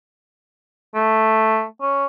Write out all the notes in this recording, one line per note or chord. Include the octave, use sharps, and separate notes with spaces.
A3
C#4